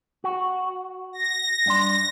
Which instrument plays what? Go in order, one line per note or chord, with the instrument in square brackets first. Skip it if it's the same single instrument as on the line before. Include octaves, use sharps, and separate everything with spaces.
[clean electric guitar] F#4
[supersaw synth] A#6
[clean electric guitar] G2 D4 C6